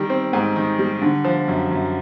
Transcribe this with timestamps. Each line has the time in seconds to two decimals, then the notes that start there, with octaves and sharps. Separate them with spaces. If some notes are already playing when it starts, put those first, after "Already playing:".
Already playing: D#3 G3
0.10 C4
0.33 G#2
0.56 D#3
0.79 G3
1.02 D3
1.24 F3
1.48 F#2
1.71 F#2